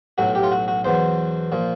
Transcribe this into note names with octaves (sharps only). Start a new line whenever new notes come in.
B1 A2 F#3 F#4
G4
F4
F#4
F#4
E2 B2 F#3 C5
A#2 F3